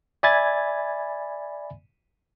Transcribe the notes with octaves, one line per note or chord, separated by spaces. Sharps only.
D5 E5 G#5 B5 G#6 A6